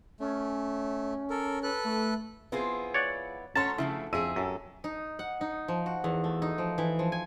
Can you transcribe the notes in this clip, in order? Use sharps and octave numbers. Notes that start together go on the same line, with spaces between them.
A3 C#4
A4 A#4
A4 B4 F#6
A3
F3 B3 C4 E4 F4 G#4
C#5 D5 F#5
D2 C#4 A4 C#5 F#5 A5 A#5 C6
C#3 F3 A3 E4
F2 E4 G#4 E6 D#7
F#2 G4 A4
D#4
F#5
D#4
F3
F#4
E2
A3
D#4
F3
E3
F3
G#5